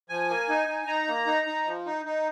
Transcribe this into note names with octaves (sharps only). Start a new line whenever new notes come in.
F3 G#5
A#3
D#4
D#4
D#4 A#5
A#3
D#4
D#4
F3
D#4
D#4